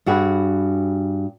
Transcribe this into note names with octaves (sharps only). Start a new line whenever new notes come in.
G2 F#4 G#4 B4